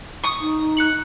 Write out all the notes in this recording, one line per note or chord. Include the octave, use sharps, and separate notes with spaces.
C#6 D#6
D#4
F#6 C#7 F#7